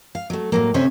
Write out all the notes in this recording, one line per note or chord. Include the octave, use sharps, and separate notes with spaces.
F5
F#3 A3
A2 F#3 A#3
D2 C3 C#4 C5 C#5 E5